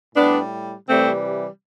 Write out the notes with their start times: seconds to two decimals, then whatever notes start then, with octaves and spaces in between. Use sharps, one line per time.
0.16 A2 G3 B3 D4
0.89 C3 E3 G3 A3 C4